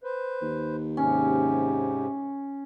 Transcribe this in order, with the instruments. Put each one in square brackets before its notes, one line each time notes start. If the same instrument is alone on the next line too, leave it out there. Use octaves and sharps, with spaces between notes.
[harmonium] B4 C5
[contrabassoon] D#2
[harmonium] G#2 C3 [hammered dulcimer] C#4